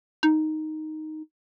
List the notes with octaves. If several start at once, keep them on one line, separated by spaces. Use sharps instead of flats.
D#4